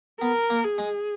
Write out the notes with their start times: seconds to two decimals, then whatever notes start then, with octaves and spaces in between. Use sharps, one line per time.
0.21 B3 A#4
0.50 A#3
0.64 G#4
0.78 G#3